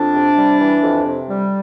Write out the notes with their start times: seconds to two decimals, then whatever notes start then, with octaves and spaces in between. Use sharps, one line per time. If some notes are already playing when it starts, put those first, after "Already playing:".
Already playing: F2 D4
0.15 C3
0.37 G3
0.60 E3
0.83 F2
1.06 C3
1.29 G3